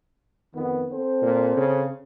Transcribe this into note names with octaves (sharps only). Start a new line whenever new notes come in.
F2 D#3 B3
C4 A4 C5
A#2
C#3